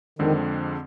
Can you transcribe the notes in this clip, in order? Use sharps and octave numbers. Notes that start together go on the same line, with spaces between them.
F2 D3 D#3 G#3 C4